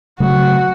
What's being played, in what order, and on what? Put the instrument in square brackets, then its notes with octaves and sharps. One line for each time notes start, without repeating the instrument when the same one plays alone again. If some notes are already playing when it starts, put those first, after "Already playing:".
[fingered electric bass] C#3 F#3 A3 [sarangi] F#4